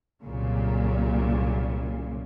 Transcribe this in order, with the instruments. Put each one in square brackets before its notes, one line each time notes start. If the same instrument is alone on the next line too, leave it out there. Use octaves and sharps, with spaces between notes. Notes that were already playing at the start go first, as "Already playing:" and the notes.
[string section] C2 F#2 A#2 C#3